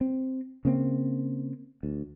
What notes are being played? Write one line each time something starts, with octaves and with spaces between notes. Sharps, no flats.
C4
C#3 A#3 C4
D2